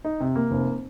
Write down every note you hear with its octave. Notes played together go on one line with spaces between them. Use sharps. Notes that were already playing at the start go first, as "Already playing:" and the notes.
D#4
C3
A#3
F1